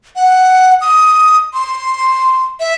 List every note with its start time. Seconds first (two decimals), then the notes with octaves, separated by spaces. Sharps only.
0.16 F#5
0.81 D#6
1.54 C6
2.60 E5